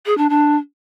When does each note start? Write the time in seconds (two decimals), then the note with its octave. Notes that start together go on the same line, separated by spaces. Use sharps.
0.06 G#4
0.18 D4
0.30 D4